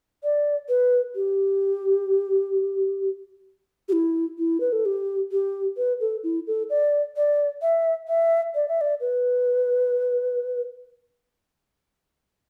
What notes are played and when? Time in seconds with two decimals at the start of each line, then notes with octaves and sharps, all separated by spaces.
0.23 D5
0.69 B4
1.15 G4
3.88 G4
3.92 E4
4.38 E4
4.60 B4
4.72 A4
4.85 G4
5.32 G4
5.77 B4
6.00 A4
6.23 E4
6.47 A4
6.70 D5
7.16 D5
7.62 E5
8.08 E5
8.55 D5
8.68 E5
8.81 D5
9.00 B4